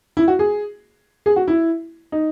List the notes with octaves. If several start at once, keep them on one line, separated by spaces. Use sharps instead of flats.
E4
F#4
G#4
G#4
F#4
E4
D#4